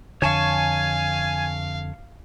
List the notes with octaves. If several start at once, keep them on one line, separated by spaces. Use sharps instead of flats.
F2 D3 C#5 F5 G#5 A5 C#6